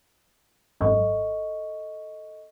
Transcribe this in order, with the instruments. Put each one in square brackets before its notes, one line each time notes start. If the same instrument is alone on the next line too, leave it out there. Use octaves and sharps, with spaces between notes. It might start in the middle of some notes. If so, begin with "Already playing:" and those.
[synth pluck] G#1 F#2 [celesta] A4 D#5 C#6